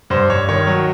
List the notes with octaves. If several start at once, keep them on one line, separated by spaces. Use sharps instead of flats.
G2 C5
G2 C#5
D#3 C#5
F#3